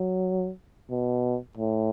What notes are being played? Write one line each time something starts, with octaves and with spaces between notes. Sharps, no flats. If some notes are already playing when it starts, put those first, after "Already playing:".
Already playing: F#3
B2
A2